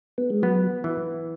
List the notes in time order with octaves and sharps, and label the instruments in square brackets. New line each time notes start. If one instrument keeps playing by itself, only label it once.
[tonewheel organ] B3
G#3
[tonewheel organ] F#3 [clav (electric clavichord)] B3
[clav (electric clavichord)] E3